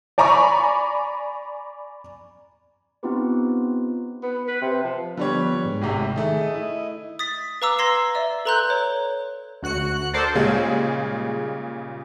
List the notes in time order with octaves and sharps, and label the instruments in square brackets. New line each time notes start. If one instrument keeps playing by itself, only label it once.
[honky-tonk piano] D5 G#5 A#5 B5 C#6 D6
[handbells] B3 C4 D#4 F4 G4 B4
[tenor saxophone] B3
B4
C3
F3
[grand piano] D3 G3 C#5 [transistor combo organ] F3 B3
[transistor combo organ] G#2
[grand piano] G#1 A2 C3
[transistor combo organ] D#3 [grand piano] A3 G#4
[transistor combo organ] D#5
[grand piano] E4
[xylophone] D#6 A6 B6
B4 F5 A#5 D6 E6
A#5 C6 G#6 A#6 C7 E7
D5 E5 E6
A4 B4 A#5 C6 F#6 G6
C#5
[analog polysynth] D2 F#4 F#6 C#7
A4 A#4 C5 D5 A5
[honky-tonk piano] A#2 C#3 G3 G#3 F4 G#4